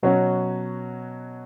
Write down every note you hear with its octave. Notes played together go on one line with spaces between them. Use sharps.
B2 F#3 C#4 F#4